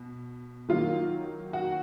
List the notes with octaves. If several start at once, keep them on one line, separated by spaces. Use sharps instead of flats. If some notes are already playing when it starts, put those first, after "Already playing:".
Already playing: B2
D#3 F#3 A#3 F4
F#4